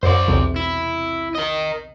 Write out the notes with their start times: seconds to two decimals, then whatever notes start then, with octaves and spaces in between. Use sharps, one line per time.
0.03 F#2 C5 D5
0.27 B1 E2 C3
0.56 E4
1.35 A#4 D#5